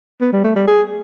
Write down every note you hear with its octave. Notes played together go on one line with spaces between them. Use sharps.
B3
G3
A3
G3
G#4